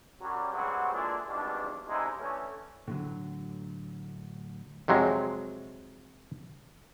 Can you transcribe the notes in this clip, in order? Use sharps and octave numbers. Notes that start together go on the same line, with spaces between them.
F#2 F#3 G3
G2 F#3 G#3 A3 C4 F#4
A#2 E3 G#3 D4 G#4 A4
G#1 E2 G2 B2 D4
A1 D2 C3 G#3 D#4 E4
D3 E3 A3 C#4
A2 D3 F#3
F2 C3 F#3 G#3